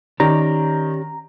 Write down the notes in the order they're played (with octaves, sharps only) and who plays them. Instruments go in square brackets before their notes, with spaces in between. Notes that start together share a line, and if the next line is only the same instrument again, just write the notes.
[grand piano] D#3 [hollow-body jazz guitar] C#4 G4 D5 [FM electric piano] A#5